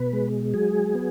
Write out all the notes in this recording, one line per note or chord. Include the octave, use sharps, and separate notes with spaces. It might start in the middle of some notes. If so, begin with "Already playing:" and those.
Already playing: B2 B4
G#3
F#3 G#4
B3